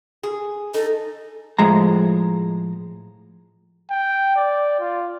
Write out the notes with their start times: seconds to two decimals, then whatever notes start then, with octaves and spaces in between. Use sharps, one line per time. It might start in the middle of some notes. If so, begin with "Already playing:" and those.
0.23 G#4
0.74 D#4 A4
1.59 A2 F3 G#3 A#5
3.91 G5
4.36 D5
4.80 F4